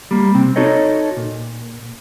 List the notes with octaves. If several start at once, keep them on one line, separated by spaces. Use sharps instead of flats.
G3 A#3
C3 C4
D#4 F#4 A4 C#5 D#5
A#2